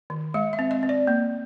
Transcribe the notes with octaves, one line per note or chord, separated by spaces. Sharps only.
D#3
G#3 F5
E5
C4
D#5
C4
D5
A#3